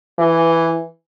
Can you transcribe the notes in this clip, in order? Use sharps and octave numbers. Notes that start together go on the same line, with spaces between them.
E3